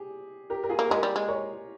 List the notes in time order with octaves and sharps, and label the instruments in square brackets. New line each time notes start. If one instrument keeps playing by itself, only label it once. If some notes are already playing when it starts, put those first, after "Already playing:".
Already playing: [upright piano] G4 G#4
G4 A#4
A#4
F4 G#4
[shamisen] A#3
[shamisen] G#3 [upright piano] G4 A#4
[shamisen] G3
G#3
[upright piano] A#4 C#5